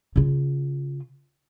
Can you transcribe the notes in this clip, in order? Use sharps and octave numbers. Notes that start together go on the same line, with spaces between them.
C#3 F4